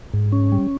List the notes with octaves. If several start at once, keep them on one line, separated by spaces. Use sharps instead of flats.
G#2
C#4
G3